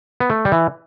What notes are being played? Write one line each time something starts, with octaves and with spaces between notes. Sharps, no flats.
B3
A3
G3
E3